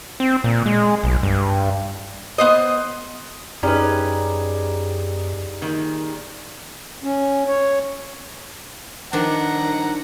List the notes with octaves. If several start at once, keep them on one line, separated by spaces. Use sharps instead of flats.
C4
A#2
G#3
B1
G2
B3 C5 D#5
F#2 G3 C#4 D#4 G#4 B4
A#2 D#3
C#4
C#5
D#3 F3 D4 F#5 A#5